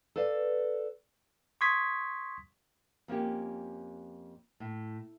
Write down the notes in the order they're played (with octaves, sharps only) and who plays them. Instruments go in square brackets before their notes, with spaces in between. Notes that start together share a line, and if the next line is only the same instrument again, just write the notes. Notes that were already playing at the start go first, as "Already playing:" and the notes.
[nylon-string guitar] A4 B4 D5 F5
[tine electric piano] C6 C#6 D#6 G#6 B6
[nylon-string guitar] F2 A#3 C#4 G4
A2